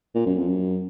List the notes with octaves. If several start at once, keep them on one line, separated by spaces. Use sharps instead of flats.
A#2
F#2
F2
F#2